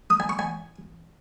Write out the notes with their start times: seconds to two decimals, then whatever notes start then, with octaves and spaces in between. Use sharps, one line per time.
0.10 D#6
0.20 G#5
0.29 C#6
0.39 G#5